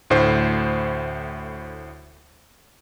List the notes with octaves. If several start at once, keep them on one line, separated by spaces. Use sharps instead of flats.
D2 A2 C5